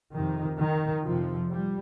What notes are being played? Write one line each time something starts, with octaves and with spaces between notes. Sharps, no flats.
F2 C3 D#3
D#3
F2 C3 F3
G3